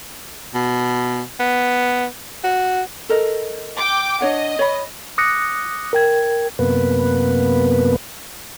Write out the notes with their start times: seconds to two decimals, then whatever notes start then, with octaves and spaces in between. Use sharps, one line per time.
0.54 B2
1.39 B3
2.44 F#4
3.09 A4 A#4 D#5
3.77 G5 D6
4.21 D4 C#5 D#5 F#5
4.59 C#5 B5
5.18 D6 D#6 F#6 A#6 C#7
5.93 A#4 G5 G#6
6.59 F#2 C3 A#3 B3 B4